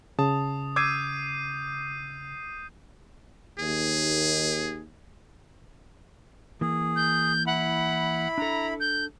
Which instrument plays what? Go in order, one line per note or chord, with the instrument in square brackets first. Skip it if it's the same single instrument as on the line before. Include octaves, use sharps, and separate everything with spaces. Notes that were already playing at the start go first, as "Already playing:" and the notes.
[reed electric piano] C#3 [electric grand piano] A5 [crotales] D#6
[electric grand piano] D6 E6 G#6 [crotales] G6 C7 D#7
[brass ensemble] D#2 [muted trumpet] G#4
[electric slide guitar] E3 A#3 [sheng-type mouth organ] G#4
[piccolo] G6
[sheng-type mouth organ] E4 B5 [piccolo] F#5
[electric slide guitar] D4 A4 [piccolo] A#5
[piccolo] G6